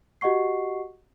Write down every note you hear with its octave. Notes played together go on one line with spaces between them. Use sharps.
F#4 G4 D#5 F#5 C#6 C7